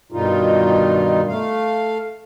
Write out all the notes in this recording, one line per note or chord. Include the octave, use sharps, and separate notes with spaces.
G2 B2 D#3 G3 D#4 F4
A3 F5